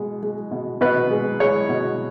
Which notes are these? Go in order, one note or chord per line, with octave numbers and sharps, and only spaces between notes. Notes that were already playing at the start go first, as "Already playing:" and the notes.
Already playing: B2 G#3
G#3
B2
B2 B4
G#3
G#3 C#5
B2